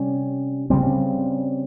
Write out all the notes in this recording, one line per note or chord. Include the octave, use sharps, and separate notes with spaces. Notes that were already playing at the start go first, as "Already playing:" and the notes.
Already playing: C3 G3 C#4
C#3 G3 C4